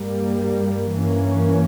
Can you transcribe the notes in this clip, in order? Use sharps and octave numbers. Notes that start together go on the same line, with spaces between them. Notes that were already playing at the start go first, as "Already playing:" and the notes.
Already playing: G2 G3 A#3
G2 E3 A#3 C#4